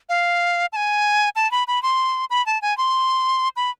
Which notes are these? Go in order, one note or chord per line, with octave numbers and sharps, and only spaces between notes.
F5
A5
G#5
A5
B5
B5
C6
B5
A5
G#5
C6
B5